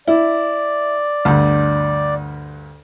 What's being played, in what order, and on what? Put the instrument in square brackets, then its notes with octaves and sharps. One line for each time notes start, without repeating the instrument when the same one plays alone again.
[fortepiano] E4 [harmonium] D5
[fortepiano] D2 G2